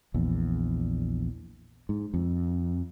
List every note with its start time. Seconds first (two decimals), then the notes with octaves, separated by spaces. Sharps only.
0.14 A#1 E2
1.89 G#2
2.14 F2